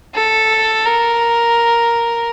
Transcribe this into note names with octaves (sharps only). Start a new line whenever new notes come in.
A4
A#4